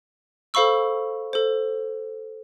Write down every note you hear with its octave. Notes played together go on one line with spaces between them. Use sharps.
A4 C5 F5 B5 C#6 E6
A4 C5